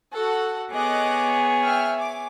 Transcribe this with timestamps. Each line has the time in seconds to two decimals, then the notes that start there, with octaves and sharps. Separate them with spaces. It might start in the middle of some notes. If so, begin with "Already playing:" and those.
0.14 F#4 A4 F#5
0.72 B3 G#4 C#5 D#5 D6 F#6
1.64 E5 G5 F6
1.96 G#5 D6